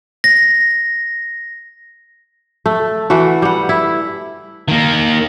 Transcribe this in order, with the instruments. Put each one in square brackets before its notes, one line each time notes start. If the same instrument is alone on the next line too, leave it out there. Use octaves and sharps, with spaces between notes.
[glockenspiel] A#6
[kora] A3
E3 A3 F#4
G3 F#5
E4
[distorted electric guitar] D#3 A#3